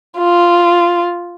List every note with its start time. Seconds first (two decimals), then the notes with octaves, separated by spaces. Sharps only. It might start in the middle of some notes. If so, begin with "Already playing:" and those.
0.18 F4